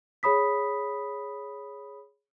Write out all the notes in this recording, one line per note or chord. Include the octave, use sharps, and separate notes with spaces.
G#4 C#5 B5 D#6 B6